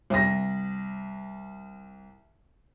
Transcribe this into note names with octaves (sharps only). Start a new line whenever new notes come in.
C2 A#6